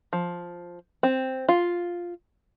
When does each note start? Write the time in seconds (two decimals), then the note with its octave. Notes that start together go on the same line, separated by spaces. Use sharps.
0.13 F3
1.03 C4
1.49 F4